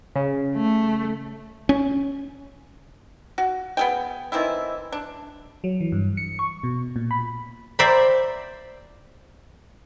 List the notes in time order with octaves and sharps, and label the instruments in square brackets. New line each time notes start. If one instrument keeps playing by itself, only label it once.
[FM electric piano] C#3
[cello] A3
[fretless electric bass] C#4
[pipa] F#4
B3 G#4 G5
D#3 E3 C4 E4
D4
[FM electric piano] F#3
E3
G2
C#7
C#6
B2
A#2
B5
[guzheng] C5 D5 E5 G5 A#5 B5